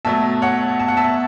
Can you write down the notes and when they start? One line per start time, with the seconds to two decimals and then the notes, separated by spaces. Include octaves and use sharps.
0.05 B2 F#3 A3 E5 A5
0.42 C#5 F#5
0.80 A5
0.88 F#5
0.97 E5 A5